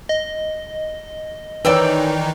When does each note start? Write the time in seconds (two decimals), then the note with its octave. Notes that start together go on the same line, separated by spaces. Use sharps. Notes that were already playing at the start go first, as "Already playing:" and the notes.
0.09 D#5
1.65 D#3 E3 D#4 B4 C#5 D5 G5 E6